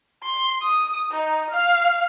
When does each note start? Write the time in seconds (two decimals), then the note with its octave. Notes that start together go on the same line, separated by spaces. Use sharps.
0.23 C6
0.62 D#6
1.11 D#4
1.50 F5